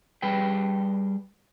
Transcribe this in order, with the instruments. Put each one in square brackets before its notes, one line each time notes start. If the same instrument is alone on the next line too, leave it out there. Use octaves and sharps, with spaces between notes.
[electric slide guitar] G3 G#4 B4 G5